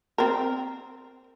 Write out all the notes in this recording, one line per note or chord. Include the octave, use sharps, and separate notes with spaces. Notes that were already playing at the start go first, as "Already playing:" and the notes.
C4 A#4